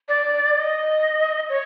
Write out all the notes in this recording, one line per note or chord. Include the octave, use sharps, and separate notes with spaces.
D5
D#5
C#5